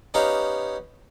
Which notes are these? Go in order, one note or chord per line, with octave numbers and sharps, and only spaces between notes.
B3 C#4 D#4 G4 C#5 F5